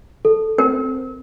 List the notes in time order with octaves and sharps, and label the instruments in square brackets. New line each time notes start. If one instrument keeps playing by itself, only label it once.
[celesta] A4
[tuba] C4 [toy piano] A#4